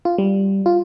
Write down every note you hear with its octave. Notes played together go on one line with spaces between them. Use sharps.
F4
G3
F4